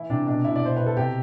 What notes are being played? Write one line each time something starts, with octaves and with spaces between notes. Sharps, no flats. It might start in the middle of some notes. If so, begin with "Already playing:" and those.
Already playing: E3 E4
C3 D4
B2 D4
B2 E4
D5
B2 C5
B2 B4
A4
C3 G4